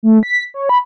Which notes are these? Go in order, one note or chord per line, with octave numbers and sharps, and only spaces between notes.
A3
B6
C#5
B5